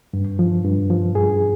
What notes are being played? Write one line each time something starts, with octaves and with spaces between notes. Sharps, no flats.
G2
F3
G2
F3
G2 G#4